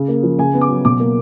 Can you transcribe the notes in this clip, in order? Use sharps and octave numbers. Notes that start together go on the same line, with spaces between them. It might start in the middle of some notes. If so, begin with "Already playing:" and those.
Already playing: C#3
A#3
F3
C#3 G#5
B3
D6
F#3
B2 D6
A#3